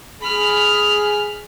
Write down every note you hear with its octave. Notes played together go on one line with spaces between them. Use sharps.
G#4 B5 F6